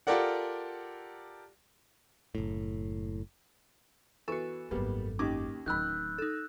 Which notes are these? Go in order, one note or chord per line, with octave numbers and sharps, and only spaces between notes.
F4 G4 A4 A#4 D5 F#5
F#1 A2
E3 B3 F#4 A4 C#6
G#1 F#2 G3 A#3 B3
D#2 C#4 D#4 G4 D6
D1 D#3 F#3 B5 E6 F#6 G6
D#4 A4